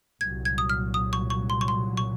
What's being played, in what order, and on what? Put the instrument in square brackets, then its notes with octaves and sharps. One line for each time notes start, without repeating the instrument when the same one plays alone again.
[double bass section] C2 A#2 F#3 [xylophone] G#6
[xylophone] G#6
D#6
F6
D#6
C#6
C#6
C6
C#6
C6
C#6